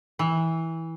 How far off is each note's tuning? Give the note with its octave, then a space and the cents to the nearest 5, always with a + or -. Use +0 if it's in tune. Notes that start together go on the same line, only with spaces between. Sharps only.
E3 -15